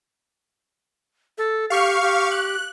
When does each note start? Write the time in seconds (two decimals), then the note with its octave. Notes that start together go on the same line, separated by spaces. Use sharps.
1.38 A4
1.70 G4 F5 C#6 F6
2.02 G4
2.32 F#6